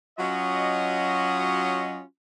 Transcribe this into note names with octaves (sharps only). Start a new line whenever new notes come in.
F#3 C#4 F4 F#4 D#5